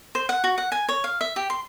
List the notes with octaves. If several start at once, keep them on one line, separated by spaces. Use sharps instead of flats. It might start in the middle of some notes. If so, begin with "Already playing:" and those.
C5
F#5
F#4
F#5
G#5
C#5
F5
E5
G4
C6